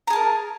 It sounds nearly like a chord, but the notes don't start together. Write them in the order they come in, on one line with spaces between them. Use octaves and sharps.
A#5 G#4 A5 A#4